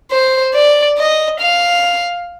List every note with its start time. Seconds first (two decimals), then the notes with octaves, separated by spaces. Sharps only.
0.11 C5
0.55 D5
0.98 D#5
1.40 F5